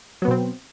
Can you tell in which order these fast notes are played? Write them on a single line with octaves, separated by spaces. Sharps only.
F#3 B3 B2 C4